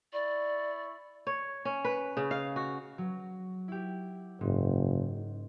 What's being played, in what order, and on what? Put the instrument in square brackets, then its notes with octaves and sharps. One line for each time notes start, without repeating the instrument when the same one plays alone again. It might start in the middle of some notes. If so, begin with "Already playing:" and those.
[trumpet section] E4 C#6 [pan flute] D5
[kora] C#5
C#4
B4
C#3
F5
F#4
[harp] F#3
E4 G4
[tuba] F#1 [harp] G#2